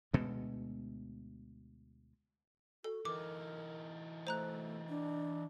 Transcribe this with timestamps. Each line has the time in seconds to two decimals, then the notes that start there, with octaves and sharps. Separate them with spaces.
0.13 D2 B2 G#3
2.84 F#4 A4
3.05 E3 D#4 A#4 D6
4.27 A3 C5 A#5 F#6
4.89 D4